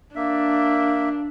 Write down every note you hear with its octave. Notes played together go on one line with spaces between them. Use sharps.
A#3 D4 E5